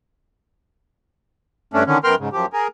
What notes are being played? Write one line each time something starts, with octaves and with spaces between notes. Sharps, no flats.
G2 A3 C#4 D4
D3 D#3 C#4
F#2 B3 A#4 G5 C6 F6
G#2 C#3
F#2 F3 G4
G#4 A#4